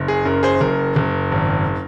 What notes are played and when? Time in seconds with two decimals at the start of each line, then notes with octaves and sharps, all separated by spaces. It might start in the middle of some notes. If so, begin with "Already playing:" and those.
Already playing: F#1
0.08 G#4
0.25 F#2 A#4
0.43 G#4 C5
0.61 F#1 A#4
0.96 F#1
1.32 G#1